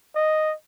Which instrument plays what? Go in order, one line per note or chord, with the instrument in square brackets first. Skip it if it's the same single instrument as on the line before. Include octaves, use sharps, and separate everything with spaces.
[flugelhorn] D#5